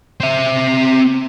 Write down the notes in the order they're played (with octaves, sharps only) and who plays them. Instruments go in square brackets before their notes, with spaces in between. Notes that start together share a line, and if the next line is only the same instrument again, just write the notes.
[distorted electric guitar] C4 E5